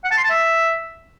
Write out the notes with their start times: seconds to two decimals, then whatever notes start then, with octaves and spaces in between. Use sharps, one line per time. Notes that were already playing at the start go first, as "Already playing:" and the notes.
0.05 F#5
0.11 A5
0.17 C6
0.24 A5
0.30 E5